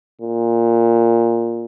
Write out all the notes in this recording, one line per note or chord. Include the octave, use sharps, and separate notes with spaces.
A#2